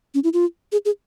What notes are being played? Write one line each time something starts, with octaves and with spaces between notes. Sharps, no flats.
C#4
E4
F4
G#4
G#4